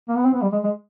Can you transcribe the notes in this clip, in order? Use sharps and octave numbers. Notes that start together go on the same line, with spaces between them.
A#3
B3
C4
B3
G3
G#3
G#3